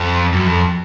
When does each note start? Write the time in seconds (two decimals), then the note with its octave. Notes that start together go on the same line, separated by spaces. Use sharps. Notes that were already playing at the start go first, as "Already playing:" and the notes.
Already playing: F2
0.33 F#2
0.47 F2